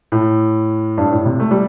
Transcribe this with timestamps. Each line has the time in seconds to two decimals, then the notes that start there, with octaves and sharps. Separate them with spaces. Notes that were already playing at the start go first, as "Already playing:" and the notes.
0.12 A2
0.98 G2
1.12 A2
1.26 C3
1.40 A3
1.51 G3